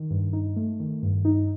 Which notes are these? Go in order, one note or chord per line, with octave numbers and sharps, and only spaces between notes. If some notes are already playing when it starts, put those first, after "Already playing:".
Already playing: D#3
G2
D#4
A3
D#3
G2
D#4